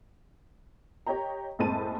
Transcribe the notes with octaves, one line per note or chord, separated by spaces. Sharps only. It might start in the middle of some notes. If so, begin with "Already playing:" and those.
G4 C#5 D#5 G5 A#5
F#1 A2 G#3 C4 A5 D#7